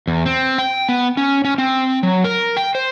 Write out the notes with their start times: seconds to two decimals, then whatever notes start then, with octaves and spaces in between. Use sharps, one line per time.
0.07 E2
0.26 C4
0.58 G5
0.89 B3
1.17 C#4
1.45 C#4
1.58 C4
2.03 F#3
2.24 A#4
2.57 G5
2.75 C5